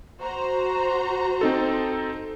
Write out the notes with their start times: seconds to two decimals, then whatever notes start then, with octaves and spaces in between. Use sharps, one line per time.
0.20 F#4 C5 A#5
1.41 C4 D#4 A4